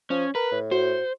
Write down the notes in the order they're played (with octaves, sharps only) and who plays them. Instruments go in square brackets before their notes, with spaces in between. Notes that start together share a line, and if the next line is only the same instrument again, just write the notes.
[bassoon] F3 [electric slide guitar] C#4
[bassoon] A#4 [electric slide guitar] B4
[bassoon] A2
[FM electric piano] F#4 [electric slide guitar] C5